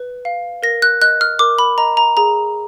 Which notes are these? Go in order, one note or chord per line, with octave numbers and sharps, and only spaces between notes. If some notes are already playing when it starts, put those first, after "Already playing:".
Already playing: B4
F5
A#4 A#6
F#6
D#5 F#6
F6
A#4 D6
B5
D#5 A#5
A#5
G#4 A#5